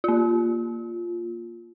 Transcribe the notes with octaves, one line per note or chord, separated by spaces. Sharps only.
A#3 F4